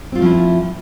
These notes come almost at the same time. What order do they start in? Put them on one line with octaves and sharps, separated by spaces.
C4 F4 A3 F3 E4